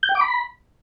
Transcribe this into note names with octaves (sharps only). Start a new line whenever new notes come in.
G6
G5
D6
B5